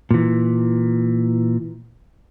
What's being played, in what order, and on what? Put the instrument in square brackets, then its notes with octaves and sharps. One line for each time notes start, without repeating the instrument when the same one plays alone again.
[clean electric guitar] A#2 E3